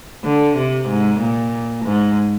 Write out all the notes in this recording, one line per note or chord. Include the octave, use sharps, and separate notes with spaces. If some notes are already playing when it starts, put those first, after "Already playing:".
D3
C3
G#2
A#2
G#2